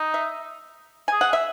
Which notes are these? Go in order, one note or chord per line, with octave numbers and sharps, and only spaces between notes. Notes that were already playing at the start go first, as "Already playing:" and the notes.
Already playing: D#4
E5
G#4 G#5
F#5
E5